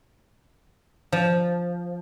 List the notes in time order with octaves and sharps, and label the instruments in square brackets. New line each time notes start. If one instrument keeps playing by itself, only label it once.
[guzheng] F3